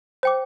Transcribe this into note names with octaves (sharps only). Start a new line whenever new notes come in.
C5 G5 D6